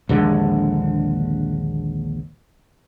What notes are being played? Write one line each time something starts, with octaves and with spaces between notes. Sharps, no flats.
A#1 D#2 D3 G#3